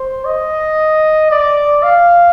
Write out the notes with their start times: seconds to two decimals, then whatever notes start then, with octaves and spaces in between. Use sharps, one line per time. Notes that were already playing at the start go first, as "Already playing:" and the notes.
Already playing: C5
0.25 D#5
1.30 D5
1.83 F5